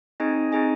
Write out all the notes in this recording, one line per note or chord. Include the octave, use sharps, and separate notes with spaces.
C4 D#4 G#4 D#5 G#5
C4 D#4 G#4 D#5 G#5